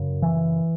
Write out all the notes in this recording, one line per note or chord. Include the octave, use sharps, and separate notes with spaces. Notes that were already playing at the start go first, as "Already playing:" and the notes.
Already playing: F#2 C#3
E3